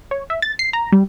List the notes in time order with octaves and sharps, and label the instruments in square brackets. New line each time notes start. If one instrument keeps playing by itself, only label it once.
[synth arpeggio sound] C#5
E5
A6
C7
A#5
G3